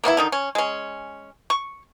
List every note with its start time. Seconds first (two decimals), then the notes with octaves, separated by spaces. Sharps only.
0.04 A#3 B3 C#4 E4
0.17 D3 D#3 D#4
0.32 C#4
0.55 G#3 C#4
1.50 C#6